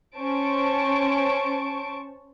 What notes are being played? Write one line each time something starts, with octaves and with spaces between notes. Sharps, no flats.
C#4 C5 A5 C#6 D7